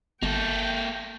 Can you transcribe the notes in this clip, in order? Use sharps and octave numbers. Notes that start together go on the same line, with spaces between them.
G1 A#3 A4 G5